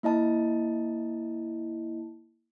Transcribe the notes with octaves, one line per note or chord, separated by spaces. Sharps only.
A#3 E4 D#5 A5